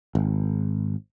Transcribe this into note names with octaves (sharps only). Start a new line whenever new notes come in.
G#1